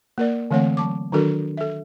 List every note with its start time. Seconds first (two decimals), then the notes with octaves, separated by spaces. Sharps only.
0.18 A#3 A#4 D5
0.51 D3 E3 A3 C4 C#5 F#5
0.77 F#3 A5 D6
1.12 D#3 F#3 D4 F#4 A4 A#4
1.57 A4 E5